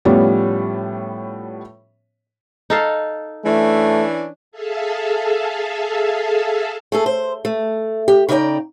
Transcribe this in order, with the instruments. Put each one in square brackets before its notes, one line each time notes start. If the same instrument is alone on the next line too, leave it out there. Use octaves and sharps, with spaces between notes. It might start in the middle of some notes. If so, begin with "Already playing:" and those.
[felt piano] A2 F3 G3 B3 C#4
[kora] D#4 A4 F5
[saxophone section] E3 C#4 D4 [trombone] A3
[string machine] G#4 A4 E5 F5 A5
[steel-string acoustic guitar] A3 G#4 A4
C5
A3
G4
C#3 D#4 D5 E5 G5 A#5